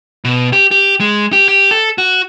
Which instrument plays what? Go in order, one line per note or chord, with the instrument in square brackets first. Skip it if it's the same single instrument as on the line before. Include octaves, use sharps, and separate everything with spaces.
[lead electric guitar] B2
G4
G4
G#3
G4
G4
A4
F#4